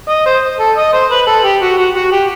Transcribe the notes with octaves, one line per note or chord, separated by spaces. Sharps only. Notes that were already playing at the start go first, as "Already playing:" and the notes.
D#5
C5
A4
D#5
C5
B4
A4
G4
F#4
F#4
F#4
G4